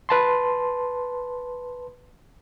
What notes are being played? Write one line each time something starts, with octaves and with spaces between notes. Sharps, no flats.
B4 A5 C6